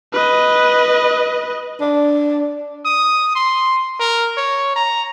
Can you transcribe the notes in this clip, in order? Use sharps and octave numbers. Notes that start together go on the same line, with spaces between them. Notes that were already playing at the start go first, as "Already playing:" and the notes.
B4 D#5
D4
D#6
C6
A#4
C#5
A#5